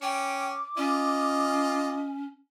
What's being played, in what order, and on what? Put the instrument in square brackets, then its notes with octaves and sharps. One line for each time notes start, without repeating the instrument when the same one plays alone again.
[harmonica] C#4 [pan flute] G5 [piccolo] D6
[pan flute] C#4 [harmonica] F4 D#5